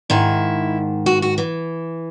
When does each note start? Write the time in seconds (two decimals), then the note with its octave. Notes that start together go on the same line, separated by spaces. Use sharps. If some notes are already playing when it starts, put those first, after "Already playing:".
0.10 G#2 D#3 E4
1.06 F#4
1.22 F#4
1.38 E3